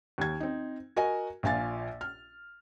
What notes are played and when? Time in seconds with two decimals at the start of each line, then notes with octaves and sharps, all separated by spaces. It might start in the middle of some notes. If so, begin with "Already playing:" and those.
0.18 D#2 G#6
0.40 C4 D#4
0.96 F#4 A#4 D#5 G#5
1.43 A#1 A#2 F5 G#5 A6
2.01 F6